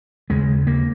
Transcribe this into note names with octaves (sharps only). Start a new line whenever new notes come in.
D#2 C#3 G#3
A#3